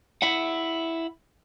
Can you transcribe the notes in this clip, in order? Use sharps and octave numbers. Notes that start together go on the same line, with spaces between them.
E4 E5 F#5